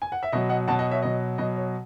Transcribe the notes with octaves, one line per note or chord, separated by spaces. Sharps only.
G#5
F#5
E5
B2 F#3 D#5
D#5 F#5
B2 F#3 F#5 A5
D#5 F#5
C#5 E5
B2 F#3 D#5
B2 F#3 D#5
C#5